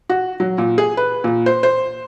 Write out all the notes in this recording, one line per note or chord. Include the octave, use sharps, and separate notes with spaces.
F#4
F#3
A#2
G#4
B4
A#2
C5
C5